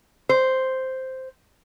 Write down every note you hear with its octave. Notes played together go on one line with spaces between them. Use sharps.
C5